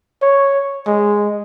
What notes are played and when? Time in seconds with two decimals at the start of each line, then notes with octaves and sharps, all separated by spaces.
0.22 C#5
0.87 G#3